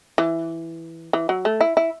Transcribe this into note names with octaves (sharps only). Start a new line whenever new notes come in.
E3
E3
F#3
A3
E4
E4